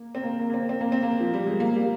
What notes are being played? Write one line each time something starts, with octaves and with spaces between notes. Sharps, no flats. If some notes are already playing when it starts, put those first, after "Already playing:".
Already playing: A#3
C4
A#3
A#3
A#3
C4
C4
A#3
C4
A#3
F3
G3
G#3
A#3
G3